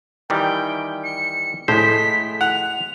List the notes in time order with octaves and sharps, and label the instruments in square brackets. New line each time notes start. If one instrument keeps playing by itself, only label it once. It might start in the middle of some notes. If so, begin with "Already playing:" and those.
[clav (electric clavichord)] D#3 E3 G3 [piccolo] G5
[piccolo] C#7
[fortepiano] A2 [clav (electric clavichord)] G#3 C5 [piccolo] B6
[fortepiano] F#5 [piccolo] F7